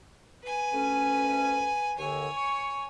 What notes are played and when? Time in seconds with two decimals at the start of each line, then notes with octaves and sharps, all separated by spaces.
0.43 B4 G#5
0.73 D2 A3 C#4
1.98 D#2 D3 C#5 G#5
2.36 C#6